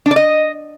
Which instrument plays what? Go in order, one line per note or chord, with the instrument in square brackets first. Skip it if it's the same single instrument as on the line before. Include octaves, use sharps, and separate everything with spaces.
[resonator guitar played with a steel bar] D4
D5
D#5